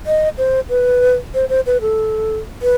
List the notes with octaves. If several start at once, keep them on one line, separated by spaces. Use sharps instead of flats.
D#5
C5
B4
C5
C5
B4
A4
B4